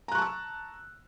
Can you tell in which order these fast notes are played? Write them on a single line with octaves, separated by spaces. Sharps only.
A#5 F#6 C#6 A5 E6